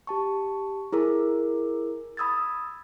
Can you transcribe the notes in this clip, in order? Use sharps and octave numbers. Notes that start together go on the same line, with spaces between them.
G4 A5 C#6
E4 G#4 A#4
B5 D#6 E6 G#6 A6